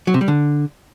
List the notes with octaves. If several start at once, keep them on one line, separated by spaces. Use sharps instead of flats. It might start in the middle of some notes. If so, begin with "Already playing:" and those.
F#3
C3
G3
D3